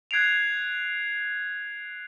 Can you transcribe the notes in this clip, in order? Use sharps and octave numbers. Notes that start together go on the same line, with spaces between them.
F#6 G#6 C7 D7 F7